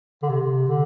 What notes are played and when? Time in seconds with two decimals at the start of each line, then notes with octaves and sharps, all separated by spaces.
0.23 D3
0.30 C3
0.68 D3